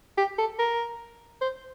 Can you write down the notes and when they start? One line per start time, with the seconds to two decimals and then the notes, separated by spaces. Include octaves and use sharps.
0.18 G4
0.38 A4
0.59 A#4
1.42 C5